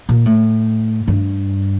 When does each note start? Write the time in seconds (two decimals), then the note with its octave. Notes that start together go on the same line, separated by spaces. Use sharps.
0.09 A#2
0.25 A2
1.08 G2